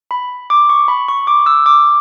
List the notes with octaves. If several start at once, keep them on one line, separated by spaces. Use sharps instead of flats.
B5
D6
C#6
B5
C#6
D6
E6
D6